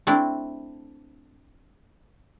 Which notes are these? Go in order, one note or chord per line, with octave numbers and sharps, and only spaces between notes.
A3 C4 D4 E4